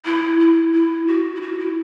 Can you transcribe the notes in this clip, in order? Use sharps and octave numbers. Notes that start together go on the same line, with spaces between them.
E4
E4
E4
F#4
E4
F#4
E4